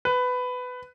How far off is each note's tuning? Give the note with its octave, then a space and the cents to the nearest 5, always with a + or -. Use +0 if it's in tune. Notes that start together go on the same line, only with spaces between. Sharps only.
B4 +15